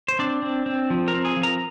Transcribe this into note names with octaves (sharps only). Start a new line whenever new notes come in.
C5
C4 D4 D5
C4
C4
F3
A#4 A#5
C4
G#4 G#5
F3
A#4 A#5